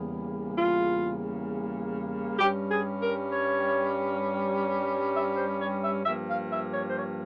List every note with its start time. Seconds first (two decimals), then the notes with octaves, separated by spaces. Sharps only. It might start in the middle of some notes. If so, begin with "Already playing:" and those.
Already playing: E2 C#3 G3 A#3
0.55 F4
2.38 G2 G3 C#4 G4
2.69 G#4
3.00 A#4
3.30 C#5
5.14 E5
5.36 C5
5.59 C#5
5.81 E5
6.04 G2 F3 A#3 E5
6.27 F5
6.50 E5
6.73 C#5
6.90 C5
6.96 C#5